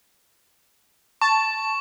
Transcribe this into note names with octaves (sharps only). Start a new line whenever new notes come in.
A5 C#6